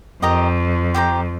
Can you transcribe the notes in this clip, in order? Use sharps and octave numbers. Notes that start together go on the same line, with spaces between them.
F2 G4 A#4 D#5 A#5
G4 C5 G5 A#5